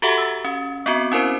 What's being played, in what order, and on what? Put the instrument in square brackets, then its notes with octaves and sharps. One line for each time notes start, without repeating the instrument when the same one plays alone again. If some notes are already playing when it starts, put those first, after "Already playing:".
[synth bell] F#4 G4 A4 E5 F#5 A#5
E6 A6
C#4
B3 C4 F#4
C#4 E4 A#4 C5